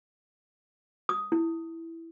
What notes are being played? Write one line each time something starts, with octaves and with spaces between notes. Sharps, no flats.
D#6
E4